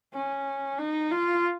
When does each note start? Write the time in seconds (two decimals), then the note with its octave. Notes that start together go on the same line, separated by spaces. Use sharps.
0.13 C#4
0.78 D#4
1.11 F4